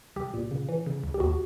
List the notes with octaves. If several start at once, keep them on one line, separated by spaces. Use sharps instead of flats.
C2 G4
A#2
C#3
E3
C#3
C#2
G4
D#2 F#4